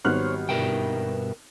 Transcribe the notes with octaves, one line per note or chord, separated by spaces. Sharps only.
G#1 F#3 G3 B3 C5 C#5 F6 F#6
G2 B2 A#4 E5 G5